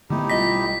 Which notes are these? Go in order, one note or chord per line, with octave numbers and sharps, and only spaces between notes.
D3 A3 B3 D#4 E4 G4
B1 G3 F4 D#5 A#6 B6